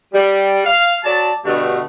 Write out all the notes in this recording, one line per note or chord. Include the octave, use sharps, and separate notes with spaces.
G3
F5
F#3 D5 A5
G2 B2 D3 G3 A3